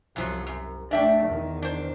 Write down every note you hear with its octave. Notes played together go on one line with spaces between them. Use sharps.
C2 F#2 F3 F#3
F#2
A3 D4 D5 E5 G5
E2 D#3
D4 C5